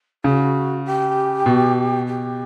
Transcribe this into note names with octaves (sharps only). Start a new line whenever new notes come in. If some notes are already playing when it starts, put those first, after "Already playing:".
C#3 F#4
G4
B2
G4